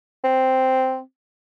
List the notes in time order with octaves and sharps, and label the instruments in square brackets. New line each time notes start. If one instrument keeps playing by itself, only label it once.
[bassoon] C4